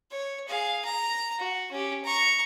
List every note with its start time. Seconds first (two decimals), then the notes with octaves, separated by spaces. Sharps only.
0.11 C#5
0.48 G#4 F5
0.85 A#5
1.39 F#4
1.71 C#4 G4
2.04 A#5 C#6